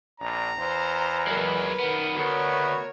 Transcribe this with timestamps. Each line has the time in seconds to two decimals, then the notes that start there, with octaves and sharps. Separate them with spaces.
0.20 A#1 D4 A#5
0.57 E2 C5
1.27 F#3 G#3 A#4 B4
1.79 D#3 B3
2.16 D2 B3 F#4 A#4 C#5